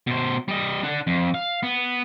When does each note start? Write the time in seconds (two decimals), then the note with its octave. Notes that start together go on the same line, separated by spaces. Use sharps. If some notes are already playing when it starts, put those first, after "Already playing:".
0.07 B2 C5
0.48 G3 D#5
0.83 D4 F#5
1.07 F2
1.34 F5
1.63 B3